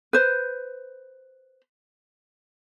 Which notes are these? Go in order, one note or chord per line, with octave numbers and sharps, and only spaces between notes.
B4 C5